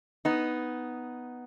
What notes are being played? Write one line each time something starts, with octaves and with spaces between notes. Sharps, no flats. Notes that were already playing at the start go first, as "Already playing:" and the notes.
B3 D#4